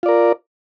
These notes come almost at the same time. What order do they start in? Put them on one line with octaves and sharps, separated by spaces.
F4 D5 A#4